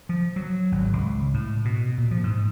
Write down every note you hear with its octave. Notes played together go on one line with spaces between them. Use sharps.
F3
F#3
G#1
C#2
A2
B2
A#2
F3
G#2